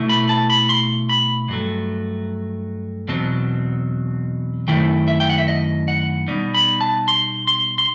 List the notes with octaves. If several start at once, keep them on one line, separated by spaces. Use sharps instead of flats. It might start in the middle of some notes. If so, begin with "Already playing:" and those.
Already playing: B2 A3 E4
B5
A5
B5
C6
B5
G2 F#3 A3
E2 B2 F#3 C4 A5
F#2 D#3 A3 E4 G5
E5
G5
F#5
E5
D#5
F#5
B2 G3 B3 D#4
B5
A5
C6
C6
C6